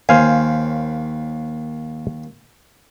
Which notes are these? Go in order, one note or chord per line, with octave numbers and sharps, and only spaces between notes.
D#2 C5 F5 G#5